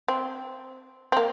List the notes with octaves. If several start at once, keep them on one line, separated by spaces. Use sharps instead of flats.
C4
C4
A#3